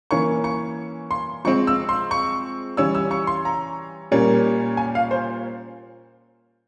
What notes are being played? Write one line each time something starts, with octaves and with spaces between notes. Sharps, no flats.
E3 A#3 C#4 C#6
C#6
C6
F3 G#3 C4 C#6
E6
C6
C#6
E3 G3 C#4 E6
E6
C#6
C6
A#5
A#2 G3 A#3 C#4
G#5
F5
C5